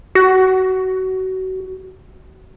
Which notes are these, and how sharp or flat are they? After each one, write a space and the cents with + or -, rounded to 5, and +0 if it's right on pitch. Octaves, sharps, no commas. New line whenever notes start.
F#4 +25